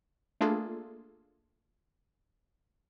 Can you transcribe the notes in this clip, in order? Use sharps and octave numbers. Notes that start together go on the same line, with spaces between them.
A3 A#3 D4 F4 G#4 A4